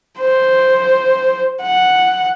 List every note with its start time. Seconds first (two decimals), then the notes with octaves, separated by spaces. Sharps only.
0.19 C5
1.61 F#5